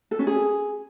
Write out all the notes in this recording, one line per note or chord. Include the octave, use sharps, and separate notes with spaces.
A4
C#4
G#4